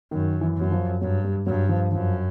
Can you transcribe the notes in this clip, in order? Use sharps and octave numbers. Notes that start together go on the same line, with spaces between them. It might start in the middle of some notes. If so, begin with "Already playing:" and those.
F#2 D#3
E3
F#2 F#3
F3
G2 F#3
G3
G2 F#3
F3
F#2 F3